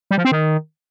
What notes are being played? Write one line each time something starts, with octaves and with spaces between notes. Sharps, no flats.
G3
F3
C4
D#3